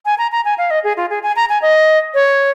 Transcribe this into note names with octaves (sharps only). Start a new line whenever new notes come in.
G#5
A#5
A#5
G#5
F5
D#5
G#4
F4
G#4
G#5
A#5
G#5
D#5
C#5